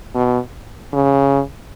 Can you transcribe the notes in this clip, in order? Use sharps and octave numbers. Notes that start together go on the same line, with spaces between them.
B2
C#3